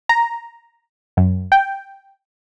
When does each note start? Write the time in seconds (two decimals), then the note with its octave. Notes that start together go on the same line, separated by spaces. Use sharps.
0.09 A#5
1.17 F#2
1.52 G5